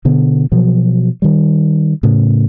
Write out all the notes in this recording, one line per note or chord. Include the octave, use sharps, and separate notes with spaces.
B2 D3 B3
B2 F3 F#3
D#3 G3
A2 C#3